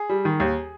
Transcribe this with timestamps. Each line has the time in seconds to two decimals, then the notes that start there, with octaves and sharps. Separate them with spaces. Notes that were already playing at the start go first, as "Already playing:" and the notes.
Already playing: G#4
0.09 G3
0.25 D#3
0.40 D#2